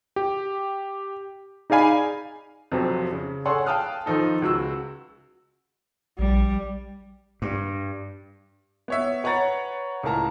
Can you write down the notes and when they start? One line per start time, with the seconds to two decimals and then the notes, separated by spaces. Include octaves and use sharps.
0.16 G4
1.70 D#4 G#4 D5 F5 G#5 B5
2.72 F2 C3 F3 F#3
3.12 C#3
3.45 G#4 A4 C#5 F#5 G#5 C6
3.66 F5 G5 A5 D#6 F6 F#6
4.06 D#3 F3 D#4 A4
4.42 C#2 F#4 E6
6.19 A#1 G3
7.42 G2
8.88 B3 C#5 E5
9.24 B4 C#5 F#5 A#5 A6
10.03 C#2 A2 A#4 A5 A#5